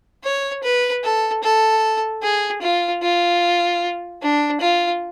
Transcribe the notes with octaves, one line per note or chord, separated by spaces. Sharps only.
C#5
B4
A4
A4
G#4
F4
F4
D4
F4